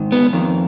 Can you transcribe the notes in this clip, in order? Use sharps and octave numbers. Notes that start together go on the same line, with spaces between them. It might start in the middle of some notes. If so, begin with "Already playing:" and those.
Already playing: G#2 D#3
B3
F2 D#3